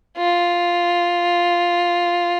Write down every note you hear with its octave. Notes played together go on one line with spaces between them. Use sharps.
F4